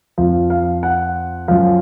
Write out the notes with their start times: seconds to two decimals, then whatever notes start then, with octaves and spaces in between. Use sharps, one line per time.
0.18 F2 F3
0.50 F5
0.83 F#5
1.48 F#2 F3 F5